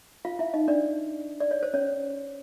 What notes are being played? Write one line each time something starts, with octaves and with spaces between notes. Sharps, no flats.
F4 F5
E4 E5
D#4 D#5
D4 D5
D5
C#5
C5
C#4 C#5